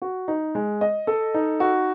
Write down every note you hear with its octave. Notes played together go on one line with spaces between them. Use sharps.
F#4
D#4
G#3
D#5
A4
D#4
F#4